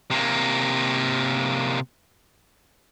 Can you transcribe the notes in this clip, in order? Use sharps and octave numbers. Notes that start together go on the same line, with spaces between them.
C3 A#3